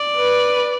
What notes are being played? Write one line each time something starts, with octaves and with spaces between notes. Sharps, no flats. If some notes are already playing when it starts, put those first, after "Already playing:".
Already playing: D5
B4